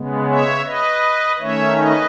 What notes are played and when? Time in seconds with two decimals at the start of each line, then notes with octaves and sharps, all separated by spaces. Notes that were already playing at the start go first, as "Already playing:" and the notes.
Already playing: C#3 G#3 B3
0.28 C#5 E5
0.65 B4 D#5
1.40 D#3 A3 C#4 C#5 E5
1.77 B4 D#5